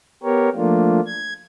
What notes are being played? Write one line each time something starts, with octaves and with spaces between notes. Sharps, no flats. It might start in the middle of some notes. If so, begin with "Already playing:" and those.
B3 G4 A#4 C#5
F3 A3 A#3 D4 F4
G#6